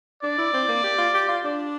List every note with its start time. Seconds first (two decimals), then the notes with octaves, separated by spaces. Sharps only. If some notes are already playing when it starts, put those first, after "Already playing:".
0.23 D4 D5
0.38 E4
0.53 C4
0.68 A#3
0.84 G4
0.98 F4
1.14 G4
1.28 F4
1.44 D4